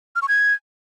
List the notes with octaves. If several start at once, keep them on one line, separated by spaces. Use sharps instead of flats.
F6
C#6
G#6